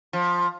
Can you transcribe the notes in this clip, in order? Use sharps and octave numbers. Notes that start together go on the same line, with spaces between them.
F3